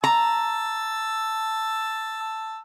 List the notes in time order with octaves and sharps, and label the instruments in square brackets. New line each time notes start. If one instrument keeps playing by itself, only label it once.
[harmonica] A5 E6 [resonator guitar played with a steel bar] A#5